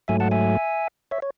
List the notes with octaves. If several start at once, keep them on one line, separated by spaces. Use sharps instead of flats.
G#2 F#3 A3 E5 G#5
F#5 A5
E5 G#5
C#5 E5
C#5